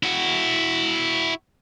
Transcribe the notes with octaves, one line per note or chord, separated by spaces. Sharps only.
E4 F#4